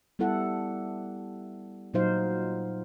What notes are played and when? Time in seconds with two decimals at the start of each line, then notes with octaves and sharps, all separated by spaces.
0.19 G3 B3 E4 A4 F#5
1.94 A#2 F#3 D#4 C5 F5